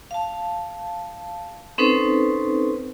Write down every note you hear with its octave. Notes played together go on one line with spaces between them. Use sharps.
F5 A5
C4 C#4 D#4 A4 B4 C5